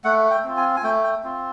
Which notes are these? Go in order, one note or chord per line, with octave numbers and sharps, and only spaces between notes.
A3 F#5
G5
C4 F4
G#5
G#5
A3 G5
G5
C4 F4